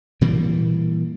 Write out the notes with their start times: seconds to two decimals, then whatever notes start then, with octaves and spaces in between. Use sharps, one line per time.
0.21 A#2 E3 G3 A#3